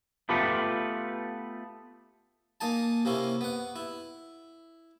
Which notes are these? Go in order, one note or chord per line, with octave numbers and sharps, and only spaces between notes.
A3 B3 F4 G4 A4 B4
A#3 D#4 G#5 A5
C3 A#3 C#4 E4
B3 F#5
E4